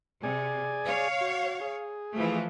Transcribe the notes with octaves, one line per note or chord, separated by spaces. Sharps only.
C3 G#4 D5 G#5
C#5 F5
F#4
G#4
E3 F3 A3